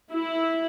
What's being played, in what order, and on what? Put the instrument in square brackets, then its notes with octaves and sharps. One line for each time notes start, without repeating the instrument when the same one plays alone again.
[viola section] E4